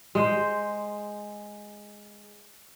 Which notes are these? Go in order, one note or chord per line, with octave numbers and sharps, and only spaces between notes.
G#3 C5